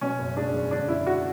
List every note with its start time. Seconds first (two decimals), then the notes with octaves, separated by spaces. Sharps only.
0.01 B2 C#4
0.19 F#1
0.37 G#3 D4
0.54 E2
0.71 D3 D4
0.88 F#1 E4
1.07 G#3 F#4